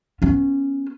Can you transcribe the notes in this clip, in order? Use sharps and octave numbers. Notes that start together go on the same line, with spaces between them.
B3 C#4